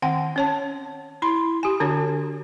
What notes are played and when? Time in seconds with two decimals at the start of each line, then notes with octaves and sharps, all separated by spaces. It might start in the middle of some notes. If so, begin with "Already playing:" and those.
0.02 D#3 C4 F#5 G5
0.36 C#4 C#5 A5
1.22 E4 B5 C6
1.63 G4 G#5
1.80 D3 D4 F#4 C#5